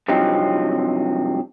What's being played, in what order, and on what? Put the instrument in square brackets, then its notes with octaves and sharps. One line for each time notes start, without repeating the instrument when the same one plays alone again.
[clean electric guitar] G2 C3 F3 F#3 C4 D#4